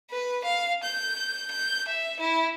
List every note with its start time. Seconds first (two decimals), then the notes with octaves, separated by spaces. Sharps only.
0.11 B4
0.44 F5
0.84 G6
1.51 G6
1.88 E5
2.20 E4